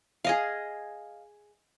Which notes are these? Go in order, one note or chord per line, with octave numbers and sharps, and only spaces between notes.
G#4 D#5 F5